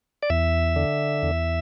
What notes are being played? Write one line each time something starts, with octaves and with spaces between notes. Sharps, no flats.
D5
E2 E5
D3
E2